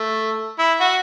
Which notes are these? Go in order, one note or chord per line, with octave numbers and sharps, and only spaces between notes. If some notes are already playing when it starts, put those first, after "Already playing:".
Already playing: A3
E4
F#4